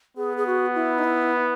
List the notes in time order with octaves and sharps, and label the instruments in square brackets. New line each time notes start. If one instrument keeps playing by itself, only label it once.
[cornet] B3 [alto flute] G#4
[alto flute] G#4
F#4
E4
D#4
E4